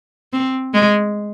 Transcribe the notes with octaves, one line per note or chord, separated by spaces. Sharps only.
C4
G#3